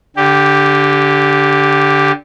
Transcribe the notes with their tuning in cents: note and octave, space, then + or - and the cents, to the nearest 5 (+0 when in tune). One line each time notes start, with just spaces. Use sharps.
D3 -15 G4 +0